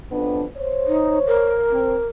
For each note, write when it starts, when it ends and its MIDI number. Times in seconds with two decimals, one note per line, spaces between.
0.11 0.44 41
0.11 0.44 59
0.11 0.44 62
0.57 1.57 72
0.57 1.57 73
0.87 1.19 63
1.27 2.07 70
1.71 1.95 60